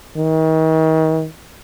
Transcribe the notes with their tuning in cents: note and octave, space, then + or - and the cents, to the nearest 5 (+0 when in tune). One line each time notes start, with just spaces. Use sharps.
D#3 +35